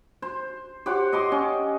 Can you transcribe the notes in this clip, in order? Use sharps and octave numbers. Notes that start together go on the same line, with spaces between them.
C5
G4 C5 C#5 F#5
D#5 C6 D6
C#4